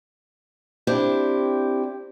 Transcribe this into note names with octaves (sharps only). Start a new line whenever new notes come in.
C4 D4 E4 G4